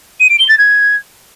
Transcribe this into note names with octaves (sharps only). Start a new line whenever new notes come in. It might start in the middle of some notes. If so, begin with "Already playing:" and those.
D#7
D7
G7
A6
G#6